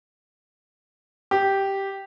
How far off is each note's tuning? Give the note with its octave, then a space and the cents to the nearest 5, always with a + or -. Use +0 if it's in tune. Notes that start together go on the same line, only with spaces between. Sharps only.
G4 -5